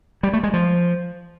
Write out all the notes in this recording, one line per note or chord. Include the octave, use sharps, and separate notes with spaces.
G3
A3
G#3
F3